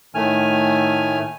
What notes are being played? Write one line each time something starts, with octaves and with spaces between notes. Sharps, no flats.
A2 D#3 A3 G#5 F6